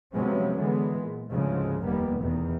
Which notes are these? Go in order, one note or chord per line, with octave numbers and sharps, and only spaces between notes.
C3 F3 F#3 G#3 B3 C#4
D3 E3 G#3 B3
A#2
D2 G#2 C#3 F3 G#3
F1 D#2 G3 A#3 B3
E2 B2 D#3